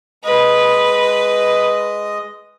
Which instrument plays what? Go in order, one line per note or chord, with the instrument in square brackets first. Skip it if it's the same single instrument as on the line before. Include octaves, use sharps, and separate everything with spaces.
[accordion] G#3 D#5 D#6 [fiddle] B4